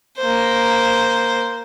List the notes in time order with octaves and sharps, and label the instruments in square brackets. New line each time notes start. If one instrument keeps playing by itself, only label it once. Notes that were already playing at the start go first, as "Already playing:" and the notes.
[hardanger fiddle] A#3 C5